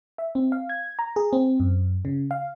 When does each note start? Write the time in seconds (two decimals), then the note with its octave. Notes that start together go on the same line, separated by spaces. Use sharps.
0.18 E5
0.35 C4
0.52 F5
0.69 G#6
0.99 A#5
1.16 G#4
1.33 C4
1.60 F#2
2.05 C#3
2.31 F5